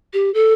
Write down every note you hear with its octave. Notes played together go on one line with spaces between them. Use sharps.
G4
A4